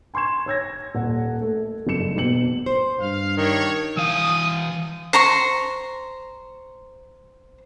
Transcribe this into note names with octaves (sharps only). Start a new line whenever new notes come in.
G#5 C6 C#6 G#6 E7
C#5 E6 G#6 A#6
D#1 F#5
A3 A4
F#1 G2 A4 C#7 E7
E1 B2 C#7 F#7
C5
G2 F5
D#3 D4 C#5
E3 F5 D#6
C5 A#5 C6 C#6